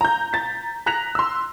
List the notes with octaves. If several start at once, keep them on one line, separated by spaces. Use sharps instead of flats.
A#5 G6
A#5 A6 B6
A#5 F#6 A#6 B6 F7
C6 E6